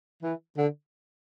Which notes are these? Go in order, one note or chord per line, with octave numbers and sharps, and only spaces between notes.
E3
D3